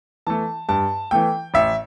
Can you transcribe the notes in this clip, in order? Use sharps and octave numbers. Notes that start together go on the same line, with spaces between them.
E3 A3 A5
G2 A5
E3 A3 G5
A1 E5